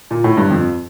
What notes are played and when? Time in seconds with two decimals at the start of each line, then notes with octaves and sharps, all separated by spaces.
0.11 A#2
0.24 A2
0.37 G2
0.51 F2